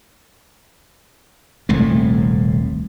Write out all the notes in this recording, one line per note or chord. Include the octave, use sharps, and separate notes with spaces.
D#1 C2 A2 A3